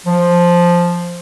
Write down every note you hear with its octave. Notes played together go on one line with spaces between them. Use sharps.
F3